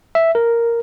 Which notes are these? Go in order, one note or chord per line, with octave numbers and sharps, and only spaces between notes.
E5
A#4